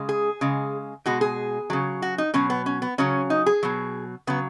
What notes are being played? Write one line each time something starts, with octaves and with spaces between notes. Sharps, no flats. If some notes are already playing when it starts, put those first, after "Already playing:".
Already playing: C#3 G#3
G#4
C#3 G#3
B2 G#3 F#4
G#4
C#3 F#3
F#4
D#4
B2 F#3 C#4
B3
C#4
B3
C#3 F#3 C#4
D#4
G#4
B2 F#3
C#3 F#3 B3